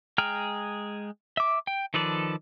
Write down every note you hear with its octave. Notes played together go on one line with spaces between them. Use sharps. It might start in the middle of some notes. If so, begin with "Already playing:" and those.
G#3 G#4 G5 A#5 F6
E5 D6
G5
D#3 F3 A4 B4 D5